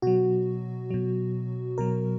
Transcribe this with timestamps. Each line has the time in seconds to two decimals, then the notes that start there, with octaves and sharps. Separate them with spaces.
0.02 B2 F#3 F#4
0.91 B2 F#3
1.78 B2 F#3 A#4